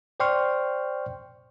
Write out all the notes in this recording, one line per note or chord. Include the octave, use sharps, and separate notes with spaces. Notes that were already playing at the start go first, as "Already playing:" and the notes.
C5 D5 G5 C6 C#6 F6